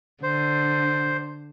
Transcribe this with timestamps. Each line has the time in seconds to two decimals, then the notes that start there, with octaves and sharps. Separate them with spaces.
0.23 D3 C5